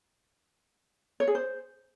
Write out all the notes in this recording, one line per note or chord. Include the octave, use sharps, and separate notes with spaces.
C#5
G#4
C5